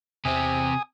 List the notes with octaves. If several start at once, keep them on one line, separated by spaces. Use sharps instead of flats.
E2 C3 C4 G#5 D#6